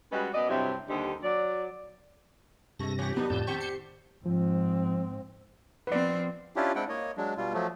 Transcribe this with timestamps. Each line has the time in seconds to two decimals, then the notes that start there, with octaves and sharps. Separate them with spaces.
0.12 G3 G#3 C#4 F#4 B4 D#5
0.34 F#2 B3 D5 D#5
0.49 G2 C3 F#3 C4 E4 E5
0.89 D#2 D3 G3 D#4 G4 C5
1.23 F#3 D5
2.80 G2 C3 G#3 A4 A#6
2.99 E3 G4 C#5
3.16 F#3 A#3 B3 D4 D#4
3.30 F2 A2 D3 A5 G6
3.47 D#3 C4 G4 C#6
3.60 C7 C#7
4.26 G#2 F3 C4
5.87 F3 C4 B4 D5
6.56 C#4 D4 E4 F4 G4
6.76 G#3 C4 D4 E4 F#5 G5
6.89 A#3 C#5 D#5
7.17 F#3 G#3 D4
7.38 B2 G3 F4
7.53 F3 F#3 A3